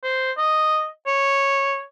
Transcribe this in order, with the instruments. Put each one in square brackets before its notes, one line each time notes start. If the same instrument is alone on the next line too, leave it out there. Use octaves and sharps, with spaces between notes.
[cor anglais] C5
D#5
C#5